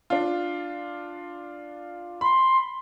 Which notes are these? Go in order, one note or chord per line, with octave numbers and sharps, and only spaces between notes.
D4 F4
B5 C6